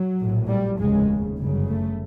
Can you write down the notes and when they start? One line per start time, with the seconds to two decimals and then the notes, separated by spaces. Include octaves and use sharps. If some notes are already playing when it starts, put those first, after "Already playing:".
Already playing: F#3
0.20 A#1 A2
0.49 G3
0.78 F1 D#2 C#3 G#3
1.38 G1 F#2 C#3
1.67 A3